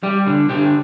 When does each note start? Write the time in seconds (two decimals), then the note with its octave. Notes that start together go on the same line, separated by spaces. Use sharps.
0.03 G3 G4
0.27 D3
0.49 D3 G4